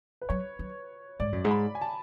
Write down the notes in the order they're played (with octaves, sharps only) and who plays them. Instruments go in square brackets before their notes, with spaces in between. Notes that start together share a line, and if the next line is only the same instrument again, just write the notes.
[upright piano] B4
[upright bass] F#3 [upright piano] C#5
[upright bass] F#3
[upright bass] G#2 [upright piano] D5
[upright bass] F#2
G#2
[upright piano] B5
G#5
A5